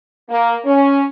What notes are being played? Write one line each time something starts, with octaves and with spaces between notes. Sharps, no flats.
A#3
C#4